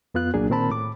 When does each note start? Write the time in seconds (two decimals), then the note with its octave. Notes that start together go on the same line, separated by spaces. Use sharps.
0.14 F2 B3 F4 F#6
0.34 C2 A#2 F#3 A#3 D4 G#4
0.50 A#2 D#3 C4 A#4 A5 B5
0.70 A2 D6